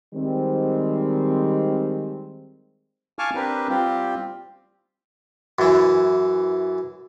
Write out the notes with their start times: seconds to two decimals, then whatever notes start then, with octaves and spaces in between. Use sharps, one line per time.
0.14 D#3 G3 G#3 C4
3.19 F5 G#5 A5 C#6 D6 F6
3.35 C4 D4 G4 A#4 B4
3.69 G3 C4 F4 G4
5.59 F#2 E3